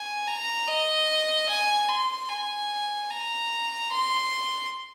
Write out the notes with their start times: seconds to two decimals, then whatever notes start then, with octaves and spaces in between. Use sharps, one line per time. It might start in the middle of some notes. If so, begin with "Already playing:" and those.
Already playing: G#5
0.28 A#5
0.68 D#5
1.49 G#5
1.89 C6
2.29 G#5
3.10 A#5
3.91 C6